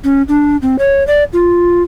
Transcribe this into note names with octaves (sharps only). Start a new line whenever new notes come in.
C#4
D4
C4
C#5
D5
F4